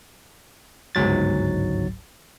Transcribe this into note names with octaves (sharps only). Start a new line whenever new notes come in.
G1 C#2 G#2 F#3 A6